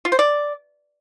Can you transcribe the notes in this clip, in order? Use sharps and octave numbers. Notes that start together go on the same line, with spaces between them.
F4
C5
D5